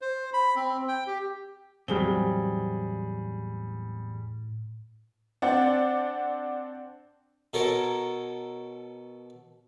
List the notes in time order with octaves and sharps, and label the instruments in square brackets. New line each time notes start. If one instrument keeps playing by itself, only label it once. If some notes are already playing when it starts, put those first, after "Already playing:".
[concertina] C5
B5
C4
G5
G4
[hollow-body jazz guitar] E2 F#3 C4 [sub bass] A2 [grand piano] G3 G#4 G7
[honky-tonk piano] C4 D4 D5 F#5
[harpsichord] B2 A4 A#4 C#5